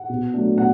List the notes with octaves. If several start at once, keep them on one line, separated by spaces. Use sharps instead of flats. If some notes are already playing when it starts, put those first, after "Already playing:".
Already playing: F#5
B2
F#3 A3 D4
B2 F#5